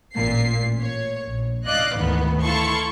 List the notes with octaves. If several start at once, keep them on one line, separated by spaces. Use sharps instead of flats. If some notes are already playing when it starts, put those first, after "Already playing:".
A1 A#2 C7
C#5
A#1
D5 D#5 F5 F#6
D2 G#2 D#3 E3 B3
E4 A4 F5 A5 C6 C#6